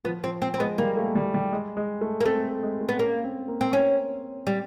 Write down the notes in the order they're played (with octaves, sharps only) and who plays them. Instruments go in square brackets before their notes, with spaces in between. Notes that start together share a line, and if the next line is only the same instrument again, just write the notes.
[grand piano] F3 [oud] B3
[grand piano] F3 [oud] C4
[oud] C4
C4
[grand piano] G#3 [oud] B3
[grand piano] G3 [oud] A#3
[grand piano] A3
G3
G3
G#3
G#3
A3
[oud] A#3
[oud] A3 [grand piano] C4
[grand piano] G#3
A3
[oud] B3
[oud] A#3 [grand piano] C#4
[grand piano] C4
A#3
[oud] C4
C#4
G3